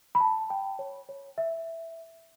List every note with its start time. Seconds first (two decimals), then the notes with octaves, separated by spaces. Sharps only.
0.15 B5
0.20 A5
0.50 G5
0.79 C#5
1.09 C#5
1.38 E5